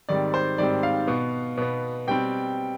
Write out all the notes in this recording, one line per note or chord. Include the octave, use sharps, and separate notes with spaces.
G#2 D#3 G3 C4 D5
C5
G#2 D#3 G3 C4 D5
F5
B2 B3
B2 B3
B2 G3 C4 G5